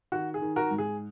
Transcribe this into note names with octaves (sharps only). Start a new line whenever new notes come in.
D#3 F#4
G#4
D#3
F#4 A#4
G#2
G#4